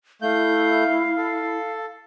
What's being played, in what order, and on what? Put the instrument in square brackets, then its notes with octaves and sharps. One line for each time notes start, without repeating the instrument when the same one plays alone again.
[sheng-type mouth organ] A3 G6 [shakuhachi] E4 [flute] F5
[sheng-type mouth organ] A4